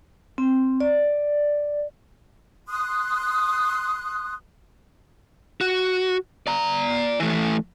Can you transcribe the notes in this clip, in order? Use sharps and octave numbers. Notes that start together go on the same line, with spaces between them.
C4
D5
C6 D#6 F#6
F#4
D5 A#5
E3 A3